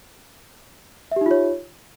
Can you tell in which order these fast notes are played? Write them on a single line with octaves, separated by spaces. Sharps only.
E5 G4 D#4 F4 C#5